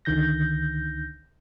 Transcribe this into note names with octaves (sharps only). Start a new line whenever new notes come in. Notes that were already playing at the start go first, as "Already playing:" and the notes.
C#2 D3 D#3 G6 A#6